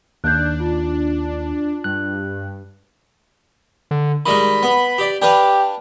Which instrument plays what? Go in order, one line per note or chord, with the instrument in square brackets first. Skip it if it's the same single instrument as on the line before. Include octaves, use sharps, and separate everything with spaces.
[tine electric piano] D#2 [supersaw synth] D4 [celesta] F#6 G6
[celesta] F4
[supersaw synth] G2 [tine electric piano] F#6
[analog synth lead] D3
[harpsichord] D#3 G3 G#3 [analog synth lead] B5
[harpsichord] B3
G4 D5
[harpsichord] D4 B4 F5 [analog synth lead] G4